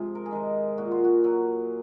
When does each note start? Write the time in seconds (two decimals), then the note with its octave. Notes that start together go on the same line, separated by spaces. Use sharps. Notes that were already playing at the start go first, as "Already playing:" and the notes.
Already playing: G#2 C3 F3 G#4
0.15 A#4
0.26 G#4
0.31 D#3 G#3 A#4
0.78 A#2 F#4
0.91 F4
1.04 F#4
1.24 F#3